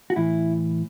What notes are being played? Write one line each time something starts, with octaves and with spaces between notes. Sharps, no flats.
F#4
A2 E3 E4